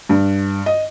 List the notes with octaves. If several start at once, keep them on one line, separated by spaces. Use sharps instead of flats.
G2
D#5